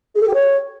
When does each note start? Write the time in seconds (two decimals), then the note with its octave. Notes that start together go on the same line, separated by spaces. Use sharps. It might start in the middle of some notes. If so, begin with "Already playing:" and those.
0.15 G#4
0.21 A4
0.27 G4
0.33 C#5